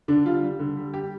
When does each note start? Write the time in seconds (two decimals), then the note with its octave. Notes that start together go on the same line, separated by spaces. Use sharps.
0.08 D3 D4
0.25 G3 F4
0.43 G3
0.59 D3
0.77 G3
0.94 G3 G4